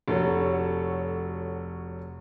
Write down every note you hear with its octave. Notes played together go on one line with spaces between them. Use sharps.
F1 F#4 A4 C#5